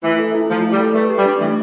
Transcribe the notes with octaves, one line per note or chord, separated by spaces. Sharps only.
E3 A3
A4
E4
F3 A3
A3
G3
A4
A3 B4
G4
G3
D4
E3 A3